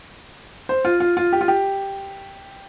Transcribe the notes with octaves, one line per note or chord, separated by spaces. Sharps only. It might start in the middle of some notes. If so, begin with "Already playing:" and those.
C5
F4
F4
F4
G4
F4
G4